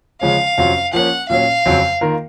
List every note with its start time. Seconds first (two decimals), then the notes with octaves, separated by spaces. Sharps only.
0.21 C#3 F3 G#3 C#4 F5
0.58 F2 C3 F#3 C#4 F4
0.93 F3 A#3 C#4 F#5
1.29 A#2 F#3 C#4 F5
1.66 F2 C#3 F#3 C4
2.01 D#3 A#3 F4 A#4